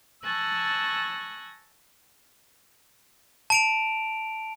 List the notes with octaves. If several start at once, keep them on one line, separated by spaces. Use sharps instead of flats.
G#5 A5 C#6 E6 F#6 A#6
A5 D7 F7